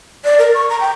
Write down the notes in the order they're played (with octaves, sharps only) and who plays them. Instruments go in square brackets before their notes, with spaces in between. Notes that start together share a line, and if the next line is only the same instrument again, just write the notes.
[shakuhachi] D5
A#4
C#6
A#5
G5